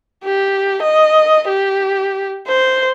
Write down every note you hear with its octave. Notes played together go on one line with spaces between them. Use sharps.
G4
D#5
G4
C5